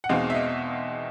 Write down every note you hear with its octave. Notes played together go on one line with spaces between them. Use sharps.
F#5
E2 B2 G#3 C4 D#4 F5
E5
D#5